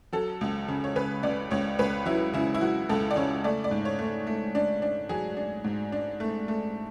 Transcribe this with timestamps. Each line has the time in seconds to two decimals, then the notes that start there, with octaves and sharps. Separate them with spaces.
0.13 F#3 A4
0.41 C#2
0.68 C#3
0.84 C#5
0.95 C#3 B4
1.23 C#2 D5
1.51 C#2 C#5
1.79 C#2 B4
2.06 F#3 E4
2.33 C#3 E4
2.54 E4
2.61 F#3 F#4
2.89 C#2 A4
3.11 D5
3.16 C#3 C#5
3.44 A3 D5
3.64 D5
3.71 G#2
3.85 C#5
3.99 A3
4.27 A3
4.55 D4
4.82 D4
5.09 F#3 G#4
5.37 D4
5.64 G#2
5.92 D4
6.20 A3
6.48 A3